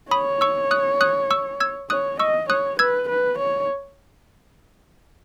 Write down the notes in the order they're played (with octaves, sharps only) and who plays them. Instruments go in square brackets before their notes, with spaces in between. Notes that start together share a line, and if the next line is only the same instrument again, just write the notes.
[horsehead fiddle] C#5 [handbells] B5 D#6
[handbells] C#6 E6
D#6 F#6
D#6 F#6
C#6 E6
E6 G#6
[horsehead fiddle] C#5 [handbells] D#6 F#6
[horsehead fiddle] D#5 [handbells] C#6 E6
[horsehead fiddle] C#5 [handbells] D#6 F#6
[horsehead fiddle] B4 [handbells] E6 G#6
[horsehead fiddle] B4
C#5